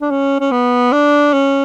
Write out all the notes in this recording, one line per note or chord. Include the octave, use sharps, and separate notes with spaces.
D4
C#4
C#4
B3
D4
C#4